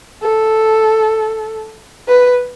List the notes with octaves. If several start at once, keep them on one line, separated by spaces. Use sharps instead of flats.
A4
B4